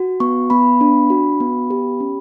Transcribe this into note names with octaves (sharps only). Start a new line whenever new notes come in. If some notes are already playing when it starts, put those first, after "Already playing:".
Already playing: F#4
B3 C#6
B3 B5
D4
F#4
B3
G4
C#4